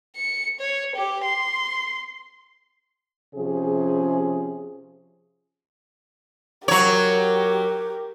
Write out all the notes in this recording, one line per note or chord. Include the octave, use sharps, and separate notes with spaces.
C#7
C#5
G4
C6
C3 F3 C#4 G#4
F#3 G4 A#4 C#5